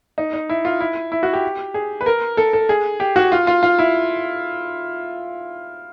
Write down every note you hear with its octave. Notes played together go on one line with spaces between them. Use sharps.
D#4
D#4
E4
F4
E4
E4
F#4
G4
G#4
B4
A#4
A4
A4
G#4
G4
F#4
F4
F4
F4
E4